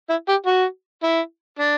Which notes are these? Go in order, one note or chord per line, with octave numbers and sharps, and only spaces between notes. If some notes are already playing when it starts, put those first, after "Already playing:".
E4
G4
F#4
E4
D4